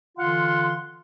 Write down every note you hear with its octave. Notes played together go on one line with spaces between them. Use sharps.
D3 E3 F4 F5 F#5 C6